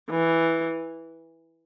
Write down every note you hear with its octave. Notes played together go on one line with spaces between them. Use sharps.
E3